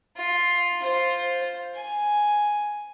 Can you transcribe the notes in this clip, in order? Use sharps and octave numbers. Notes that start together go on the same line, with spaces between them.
F4
F4 C5
G#5